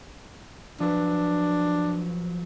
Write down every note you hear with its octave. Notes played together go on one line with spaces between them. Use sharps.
F3 F#3 D4 B4